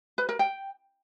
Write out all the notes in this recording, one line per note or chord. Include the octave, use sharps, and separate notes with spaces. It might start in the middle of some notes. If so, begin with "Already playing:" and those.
B4
A#4
G5